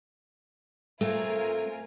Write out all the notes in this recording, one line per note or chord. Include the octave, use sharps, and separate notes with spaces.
A3 C4 F4 A#4 G#5